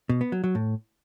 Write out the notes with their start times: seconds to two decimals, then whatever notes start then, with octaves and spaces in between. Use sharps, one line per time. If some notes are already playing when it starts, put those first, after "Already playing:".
0.09 B2
0.21 B3
0.32 F#3
0.44 F#3
0.55 A2